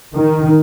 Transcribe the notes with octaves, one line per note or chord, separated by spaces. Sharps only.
D#3